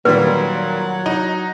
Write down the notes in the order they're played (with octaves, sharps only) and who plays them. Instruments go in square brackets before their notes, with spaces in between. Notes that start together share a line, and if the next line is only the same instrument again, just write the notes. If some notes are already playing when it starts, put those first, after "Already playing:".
[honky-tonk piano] A#2 D#3 G3 [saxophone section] F#3 F#5 [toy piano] B4
[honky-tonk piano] D#4